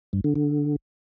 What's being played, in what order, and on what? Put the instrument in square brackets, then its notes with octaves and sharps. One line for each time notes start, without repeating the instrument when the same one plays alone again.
[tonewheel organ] G2
D3
D3